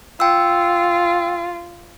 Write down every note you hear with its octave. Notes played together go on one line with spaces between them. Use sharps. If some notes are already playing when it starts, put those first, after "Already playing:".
F4 G5 E6